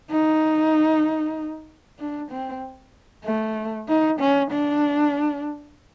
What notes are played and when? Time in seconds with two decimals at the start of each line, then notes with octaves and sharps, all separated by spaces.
0.10 D#4
1.99 D4
2.31 C4
3.25 A3
3.88 D#4
4.20 C#4
4.51 D4